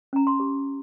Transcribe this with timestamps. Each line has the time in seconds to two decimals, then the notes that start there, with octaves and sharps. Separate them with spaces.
0.13 C#4 A#5
0.27 C6
0.40 G4